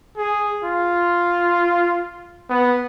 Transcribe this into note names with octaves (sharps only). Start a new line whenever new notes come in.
G#4
F4
B3